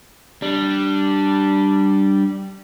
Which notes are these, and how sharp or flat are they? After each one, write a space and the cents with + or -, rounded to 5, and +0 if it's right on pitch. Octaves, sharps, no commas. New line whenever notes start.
G3 -10 D4 +0